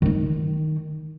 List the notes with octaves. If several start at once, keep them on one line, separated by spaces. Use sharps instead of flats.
D#3 D#4